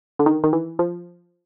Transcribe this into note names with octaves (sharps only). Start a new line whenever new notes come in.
D3
D#3
D#3
E3
F3